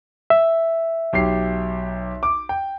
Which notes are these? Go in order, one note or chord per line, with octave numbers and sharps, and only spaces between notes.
E5
B1 G4 C7
D6
G5